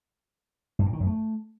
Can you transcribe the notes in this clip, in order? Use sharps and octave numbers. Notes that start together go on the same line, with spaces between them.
G2
A#2
D#3
F#2
A3